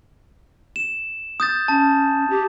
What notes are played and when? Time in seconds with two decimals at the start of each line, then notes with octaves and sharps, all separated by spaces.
0.76 E7
1.40 D#6 G6 A6
1.68 C#4 A5
2.30 G4